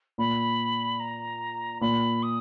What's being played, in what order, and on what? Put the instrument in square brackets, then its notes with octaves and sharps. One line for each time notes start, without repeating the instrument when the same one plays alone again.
[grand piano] A#2 [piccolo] B5
[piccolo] A#5
[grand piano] A#2 [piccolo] B5
[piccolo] D#6